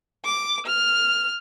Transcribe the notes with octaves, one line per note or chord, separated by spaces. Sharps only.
D6
F6